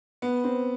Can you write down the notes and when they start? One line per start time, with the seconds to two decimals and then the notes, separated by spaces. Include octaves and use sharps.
0.22 B3
0.44 C4